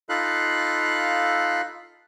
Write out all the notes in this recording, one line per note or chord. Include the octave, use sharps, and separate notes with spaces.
D#4 F4 A4 F5 B5 F#6